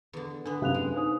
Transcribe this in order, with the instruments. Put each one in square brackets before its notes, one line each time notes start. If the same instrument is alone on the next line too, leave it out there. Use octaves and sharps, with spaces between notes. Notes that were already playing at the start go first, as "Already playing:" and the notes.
[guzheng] E2 D3
[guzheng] D3 B3 [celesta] D4
[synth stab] F#2 C3 [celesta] F5 F#6 F7
[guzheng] G#3
[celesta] D#4 C5 D#6